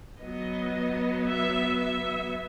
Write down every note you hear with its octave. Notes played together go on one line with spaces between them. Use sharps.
F#3 B3 D#5
E5
E5